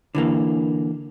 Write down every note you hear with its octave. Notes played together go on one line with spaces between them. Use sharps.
D3 E3 A#3